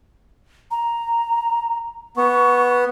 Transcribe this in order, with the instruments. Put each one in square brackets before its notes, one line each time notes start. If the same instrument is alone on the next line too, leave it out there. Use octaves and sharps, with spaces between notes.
[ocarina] A#5
[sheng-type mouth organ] B3 [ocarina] C#6